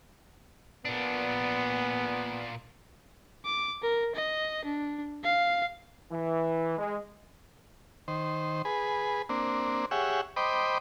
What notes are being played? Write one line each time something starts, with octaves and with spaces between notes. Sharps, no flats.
A#2 B3 D4
D6
A#4
D#5
D4
F5
E3
G#3
D#3 C5
G#4 B4
A#3 C4 D4
G4 G#4 C#5 E5 F#5
C5 D#5 G5 B5 D6